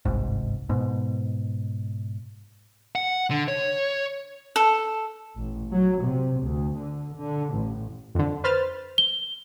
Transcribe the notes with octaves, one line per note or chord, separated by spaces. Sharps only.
G1 C2 G#2
G#2 B2
F#5
D3
C#5
A4
A1
F#3
C3
D2
D3
D3
A1
F2 D3
B4 C5 F6 A6
G7